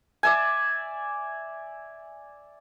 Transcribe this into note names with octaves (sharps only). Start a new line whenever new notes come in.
D5 E5 G#5